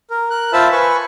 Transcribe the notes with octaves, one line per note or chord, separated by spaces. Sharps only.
A#4
A#4 F#6
F4 C5 E5 A5 B5 E6
B4 G#5 B5 C#6